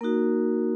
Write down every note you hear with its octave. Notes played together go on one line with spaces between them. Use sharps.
A#3 D#4 F#4 A#4